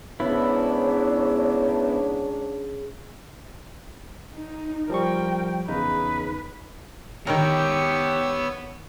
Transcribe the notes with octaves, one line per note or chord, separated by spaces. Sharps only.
G#2 C#3 B3 D4 E4 C#5
D#4
F3 G3 A#4 G5 C#6
E2 C#3 D#4 B4
D#3 B3 G4 A#4 C#5 G5 E6